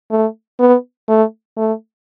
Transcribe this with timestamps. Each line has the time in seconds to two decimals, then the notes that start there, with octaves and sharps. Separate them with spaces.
0.11 A3
0.60 B3
1.08 A3
1.57 A3